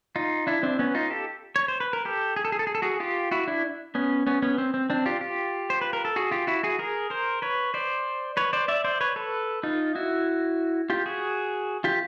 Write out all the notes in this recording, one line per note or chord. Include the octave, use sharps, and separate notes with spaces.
D#4 F4
D4 E4
C4 D4
B3 C#4
D#4 F4
G4 A4
C#5
C5
B4
A#4
G4 A4
G#4
A4
G#4
A4
G#4
A4
F#4 G#4
F4 G4
E4 F#4
D4 E4
B3 C#4
B3 C#4
B3 C#4
C4
C4
C4 D4
F4 G4
F4 G4
C5
B4
A#4
A4
F#4 G#4
F4 G4
E4 F#4
F#4 G#4
G#4 A#4
A#4 C5
B4 C#5
C5 D5
B4 C#5
C5 D5
D5 E5
C5 D5
B4 C#5
A4 B4
D#4 F4
E4 F#4
F4 G4
F#4 G#4
F4 G4